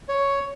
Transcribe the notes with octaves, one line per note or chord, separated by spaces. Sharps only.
C#5